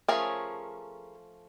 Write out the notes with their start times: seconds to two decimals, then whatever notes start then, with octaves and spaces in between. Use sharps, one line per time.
0.08 F3 A3 C#4 G#4 A#4